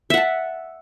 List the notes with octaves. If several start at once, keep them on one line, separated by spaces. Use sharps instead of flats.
E5 F#5 A5